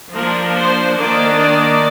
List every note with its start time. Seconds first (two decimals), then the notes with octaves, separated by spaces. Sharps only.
0.13 F3 A#3 D4 A#4
0.55 C5
0.98 D#3 A#3 D4 D5
1.39 D5